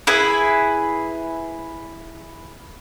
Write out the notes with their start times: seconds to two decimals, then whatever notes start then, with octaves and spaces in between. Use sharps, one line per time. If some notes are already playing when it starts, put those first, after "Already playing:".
0.07 E4 G#4 B4